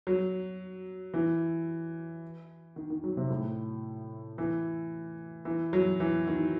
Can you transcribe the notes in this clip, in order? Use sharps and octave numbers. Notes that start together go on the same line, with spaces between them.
F#3
E3
D#3
D#3
F#3
C3
A2
E3
E3
F#3
E3
D#3